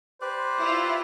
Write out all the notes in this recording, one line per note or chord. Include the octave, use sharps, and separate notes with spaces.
G4 B4 C5 D5
E4 F4